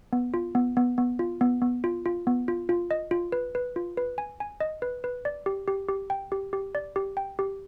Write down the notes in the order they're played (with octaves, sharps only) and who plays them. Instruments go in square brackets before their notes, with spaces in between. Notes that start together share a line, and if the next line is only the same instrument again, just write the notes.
[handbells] B3
F4
B3
B3
B3
F4
B3
B3
F4
F4
B3
F4
F4
D#5
F4
B4
B4
F4
B4
G#5
G#5
D#5
B4
B4
D5
G4
G4
G4
G5
G4
G4
D5
G4
G5
G4